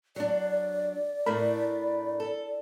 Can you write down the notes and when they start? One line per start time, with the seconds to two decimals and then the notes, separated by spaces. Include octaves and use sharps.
0.16 F#3 D4 D5
1.26 A2 A3 D4 A#4 B5
2.20 A4